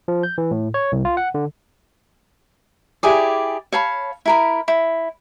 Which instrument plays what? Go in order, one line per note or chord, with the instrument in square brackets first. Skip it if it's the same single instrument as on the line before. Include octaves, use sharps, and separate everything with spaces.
[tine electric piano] F3
G6
E3
A2
C#5
C2
F4
F#5
D3
[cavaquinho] E4 G4 G#4 D5
C#5 F5 A5 B5
E4 A#4 B5
E4